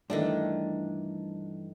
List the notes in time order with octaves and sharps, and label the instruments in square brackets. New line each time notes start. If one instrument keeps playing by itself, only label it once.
[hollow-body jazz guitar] G2 E3 [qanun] D#3 A3 D4